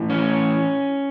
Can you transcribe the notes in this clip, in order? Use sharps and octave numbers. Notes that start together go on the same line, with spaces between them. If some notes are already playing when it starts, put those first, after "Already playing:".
Already playing: A2 E3
C#4